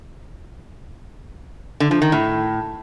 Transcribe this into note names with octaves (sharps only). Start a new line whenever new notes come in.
D3
F3
D#3
A2